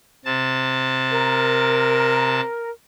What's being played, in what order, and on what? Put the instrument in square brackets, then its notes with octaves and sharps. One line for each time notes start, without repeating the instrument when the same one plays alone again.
[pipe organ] C3 A5
[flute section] A#4